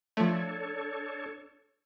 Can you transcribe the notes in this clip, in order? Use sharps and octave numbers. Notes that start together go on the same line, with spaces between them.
F3 A3 D4 A4 C#5